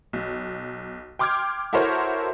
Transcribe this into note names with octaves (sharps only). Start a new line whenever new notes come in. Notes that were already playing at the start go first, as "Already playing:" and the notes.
B1
G5 C6 D6 F6 G6 G#6
E4 F#4 A4 A#4 C5 C#5